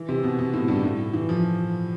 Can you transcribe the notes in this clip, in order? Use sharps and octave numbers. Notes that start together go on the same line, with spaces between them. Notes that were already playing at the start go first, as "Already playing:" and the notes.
Already playing: E3
C3
B2
B2
A2
G2
A2
E3
F3